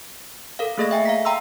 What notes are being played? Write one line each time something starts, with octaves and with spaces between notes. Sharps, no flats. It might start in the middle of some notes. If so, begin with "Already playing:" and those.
A4 A#4 F5
A3 A#3 G#4 A4 D#5 A#6
E5 G5 G#5
F5 A#5 B6
G5 A#5 C6 E6